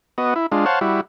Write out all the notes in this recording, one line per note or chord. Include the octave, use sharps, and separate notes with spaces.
B3 F#4 D#5
E4
G#3 D4 F4
C5 C#5 F5 F#5 A5
G3 E4 F#4